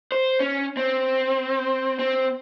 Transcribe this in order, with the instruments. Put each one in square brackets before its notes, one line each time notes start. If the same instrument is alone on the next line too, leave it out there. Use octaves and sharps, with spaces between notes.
[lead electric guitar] C5
C#4
C4
C4